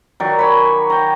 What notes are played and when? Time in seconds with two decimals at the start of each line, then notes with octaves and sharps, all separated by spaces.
0.20 D#3 F#3 D5
0.39 C#5 G#5 B5
0.90 G5 A#5